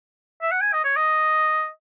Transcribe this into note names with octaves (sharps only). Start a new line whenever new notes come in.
E5
F#5
G#5
D#5
C#5
D#5